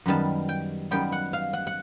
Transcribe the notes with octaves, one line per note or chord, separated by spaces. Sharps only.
F#2 D#3 G3 B3 A5
G5
F#2 D#3 G3 B3 G5
F#5
F5
F#5
F#5